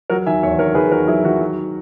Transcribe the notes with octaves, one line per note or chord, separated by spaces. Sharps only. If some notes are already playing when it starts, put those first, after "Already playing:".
F#3 F#4 A#4
D#3 E5 G#5
E2 C#5 E5
D#3 A#4 C#5
D#3 G#4 B4
D#3 F#4 A#4
F#3 E4 G#4
D#3 F#4
F#3